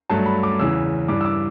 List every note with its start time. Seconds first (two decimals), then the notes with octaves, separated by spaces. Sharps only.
0.10 G2 F#3 A3 A5
0.26 B5
0.43 D6
0.59 E2 C#3 E3 E6
1.08 G2 E3 G3 D6
1.21 E6
1.25 D6